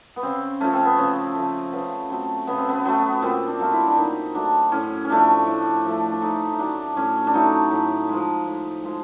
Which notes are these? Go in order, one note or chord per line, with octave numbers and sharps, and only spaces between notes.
B3
C#3 C4
F3 A3 C#4
C4
B3
C#3 C4
F3 A3
C#3 B3
F#3 A3 C4
C#3 B3
C4
B3
F#3 A3 B3
A#2 C4
D4
F#3 A3 F4
E4
D4
A#2 D#4
F#3 A3 D4
A2 C#4
C#4
F3 A3 D4
A2
F3 A3
D4
A2 D#4
D#4
F#3 A3 D4
A2 C#4
D4
F#3 A3 D#4
A2
F3 G#3
A2
F3 G#3